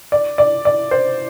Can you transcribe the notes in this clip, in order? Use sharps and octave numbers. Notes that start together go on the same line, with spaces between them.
D5
D5
D5
C5